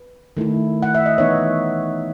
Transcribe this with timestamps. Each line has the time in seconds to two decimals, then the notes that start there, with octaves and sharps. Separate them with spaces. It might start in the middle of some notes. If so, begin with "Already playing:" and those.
Already playing: B4
0.37 D#3 A3 E4
0.83 F#5
0.95 E5
1.06 D#5
1.18 E3 B3 D#4 C#5